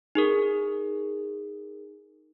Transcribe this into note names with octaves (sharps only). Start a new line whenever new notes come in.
D#4 G#4 A#4